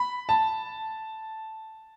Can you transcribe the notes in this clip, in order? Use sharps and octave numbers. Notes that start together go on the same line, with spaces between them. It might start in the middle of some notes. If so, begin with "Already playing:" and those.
Already playing: B5
A5